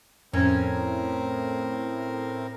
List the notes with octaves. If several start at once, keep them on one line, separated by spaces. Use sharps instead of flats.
F2 A2 C4 C#4 A#4 C5 A#5